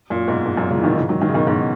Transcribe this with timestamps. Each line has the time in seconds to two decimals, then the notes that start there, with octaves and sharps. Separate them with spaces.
0.10 F#2 A#2
0.28 G#2 B2
0.46 G#2
0.57 F#2 A#2
0.70 A#2 C#3
0.78 E3
0.84 B2 D#3
0.96 C#3 E3
1.09 D#3 F#3
1.21 D#3 F#3
1.29 C#3
1.34 B2 D#3
1.47 G#2 B2